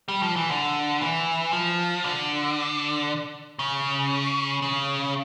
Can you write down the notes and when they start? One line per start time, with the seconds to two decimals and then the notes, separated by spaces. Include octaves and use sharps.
0.08 G3
0.22 F3
0.36 E3
0.50 D3
1.01 E3
1.53 F3
2.04 D3
3.59 C#3
4.62 C#3